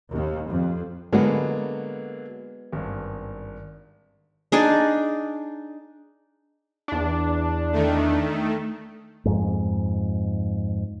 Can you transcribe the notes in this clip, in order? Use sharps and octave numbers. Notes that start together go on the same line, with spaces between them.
D#2
F2
D3 F#3 G#3 A#3 B3
G#1 G2
D4 D#4 G#4 D5
E2 D4
D#3 A3
F2 G#2